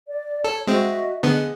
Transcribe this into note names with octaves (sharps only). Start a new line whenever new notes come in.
D5
A4 C#5
G#3 C4 F#4 D#5 E5
D3 B3 G#4 D#5